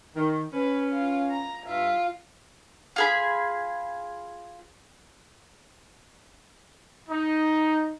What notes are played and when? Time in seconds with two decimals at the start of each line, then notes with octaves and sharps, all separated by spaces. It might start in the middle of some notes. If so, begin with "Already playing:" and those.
0.15 D#3
0.53 C#4 B4
0.92 F4
1.30 A#5
1.66 G2 F4 E5
2.96 F4 G#4 B5
7.10 D#4